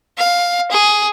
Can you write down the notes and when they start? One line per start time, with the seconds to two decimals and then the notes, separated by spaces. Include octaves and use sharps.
0.18 F5
0.71 G#4